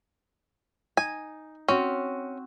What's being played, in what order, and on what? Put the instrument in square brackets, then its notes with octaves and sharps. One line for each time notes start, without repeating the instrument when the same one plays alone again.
[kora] D#4 [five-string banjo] G#5
[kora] C4 F#4 [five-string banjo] C#4